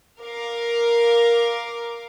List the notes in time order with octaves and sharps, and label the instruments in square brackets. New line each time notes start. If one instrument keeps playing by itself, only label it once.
[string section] A#4 F5 D6